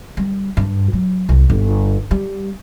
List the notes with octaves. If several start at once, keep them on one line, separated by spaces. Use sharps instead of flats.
G3
G2
F#3
C2
G1
G3